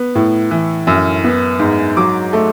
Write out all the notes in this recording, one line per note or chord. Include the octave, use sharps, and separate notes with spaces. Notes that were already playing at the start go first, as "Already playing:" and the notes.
Already playing: B3
A2
E3
F#2
B3
G#2
F#3 D6
A3